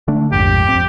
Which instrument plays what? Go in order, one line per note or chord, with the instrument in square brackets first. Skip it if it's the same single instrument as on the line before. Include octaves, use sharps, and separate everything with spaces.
[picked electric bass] D3 A3 D4
[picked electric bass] A#1 F2 G#2 [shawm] G4
[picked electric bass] G1 F2 C4